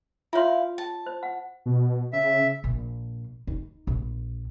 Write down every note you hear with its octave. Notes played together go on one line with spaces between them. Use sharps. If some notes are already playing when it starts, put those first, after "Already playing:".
E4 F4 C#5 F5 C6
A5
C5
F#5
B2
C#3 E5
A#1
D#4
A#1